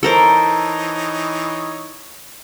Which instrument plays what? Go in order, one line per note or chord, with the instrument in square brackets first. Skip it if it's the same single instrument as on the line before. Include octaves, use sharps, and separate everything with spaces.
[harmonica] E3 D#4 C#5 [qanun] A4 A#4 C5